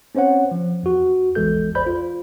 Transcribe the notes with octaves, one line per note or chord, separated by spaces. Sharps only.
C4 C#4 C5 C#5 F#5
F3
E2 F#4
A#1 E2 E3 G#3 A4 G6
A1 C5 D5 B5 G6
F4